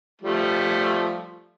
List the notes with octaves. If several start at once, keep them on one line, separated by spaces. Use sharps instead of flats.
F3 G3 A3